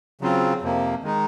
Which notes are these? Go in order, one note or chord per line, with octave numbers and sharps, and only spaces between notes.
C#3 F#3 C4 F4
F2 C3 F3 A#3
D#3 G#3 D#4